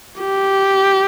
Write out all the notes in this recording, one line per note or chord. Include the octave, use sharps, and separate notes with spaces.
G4